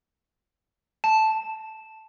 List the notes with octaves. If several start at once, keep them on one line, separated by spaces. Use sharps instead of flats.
A5